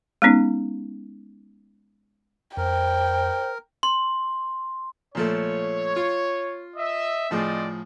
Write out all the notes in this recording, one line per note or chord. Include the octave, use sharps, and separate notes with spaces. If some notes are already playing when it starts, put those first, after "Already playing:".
G#3 B3 C#4 D#4
F2 A#4 C5 G5
C6
A#2 F3 A3 C#5
F4
D#5 E5
A2 F3 C4 G#4 D5 D#5